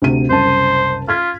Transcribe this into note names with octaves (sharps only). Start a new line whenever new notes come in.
D2 C3 D#7
F#1 C2 C5 A5
F4 F6 G#6 B6